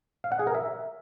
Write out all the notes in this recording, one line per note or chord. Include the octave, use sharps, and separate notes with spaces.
F5
F#5
G#4
A#4
E5